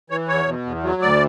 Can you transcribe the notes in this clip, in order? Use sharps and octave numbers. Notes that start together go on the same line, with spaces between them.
E3 C#5
E2 C#5
B2
E2
F#3
D2 D5